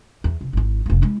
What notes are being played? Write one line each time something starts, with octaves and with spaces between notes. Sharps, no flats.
E2
F1
G#1 E4
F1 A#3
G#3 E4